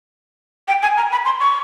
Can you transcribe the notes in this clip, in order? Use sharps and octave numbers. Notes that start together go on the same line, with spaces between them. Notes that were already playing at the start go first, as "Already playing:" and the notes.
G5
G#5
A#5
B5
C6
C#6